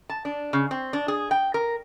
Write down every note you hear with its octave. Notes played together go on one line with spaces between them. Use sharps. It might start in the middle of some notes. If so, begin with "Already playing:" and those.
A5
D4
C#3
C4
D4
G#4
G5
A#4